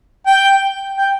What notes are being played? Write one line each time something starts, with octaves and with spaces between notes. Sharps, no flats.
G5
G5